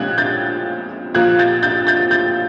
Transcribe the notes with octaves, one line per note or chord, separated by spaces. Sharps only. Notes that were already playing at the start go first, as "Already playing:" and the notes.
Already playing: A#2 F3 G#3 C#4 F#6 G#6
G6 A6
A#2 F3 A#3 F#6 G#6
G6 A6
G6 A6
G6 A6
G6 A6